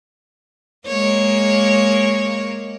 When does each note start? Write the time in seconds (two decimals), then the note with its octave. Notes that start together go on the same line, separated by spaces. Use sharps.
0.87 G#3 A#3 C#5